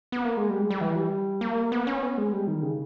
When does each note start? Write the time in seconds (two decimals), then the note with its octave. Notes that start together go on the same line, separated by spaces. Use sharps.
0.12 B3
0.25 A#3
0.37 G#3
0.50 G3
0.62 G#3
0.70 G3
0.81 E3
0.96 G3
1.41 A#3
1.72 B3
1.87 C#4
2.03 B3
2.18 G#3
2.33 G3
2.48 D#3
2.63 C#3